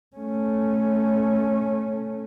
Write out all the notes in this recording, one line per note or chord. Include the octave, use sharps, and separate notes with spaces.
A3 C#4